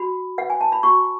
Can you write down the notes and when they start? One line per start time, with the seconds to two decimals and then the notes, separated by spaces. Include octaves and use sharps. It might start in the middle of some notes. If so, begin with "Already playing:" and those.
Already playing: F#4 B5
0.38 B4 F#5
0.50 G#5
0.61 A5
0.72 B5
0.83 F#4 C#6